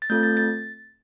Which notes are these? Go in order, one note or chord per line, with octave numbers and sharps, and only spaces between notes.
A6
A3 C4 F4 A4 G6
A6
A6